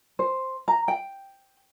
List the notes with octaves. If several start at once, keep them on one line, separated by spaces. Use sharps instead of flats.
C5
A#5
G5